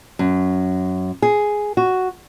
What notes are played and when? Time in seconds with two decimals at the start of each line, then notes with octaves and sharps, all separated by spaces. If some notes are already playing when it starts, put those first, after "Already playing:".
0.19 F#2
1.22 G#4
1.77 F#4